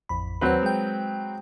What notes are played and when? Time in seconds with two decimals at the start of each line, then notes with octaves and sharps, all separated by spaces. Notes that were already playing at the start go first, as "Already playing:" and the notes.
0.09 A1 F2 B5
0.41 D#2 F#3 C4 B4 F#5
0.63 G#3 G5